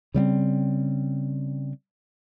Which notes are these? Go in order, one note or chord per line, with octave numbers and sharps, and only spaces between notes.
C#3 G3 B3 C4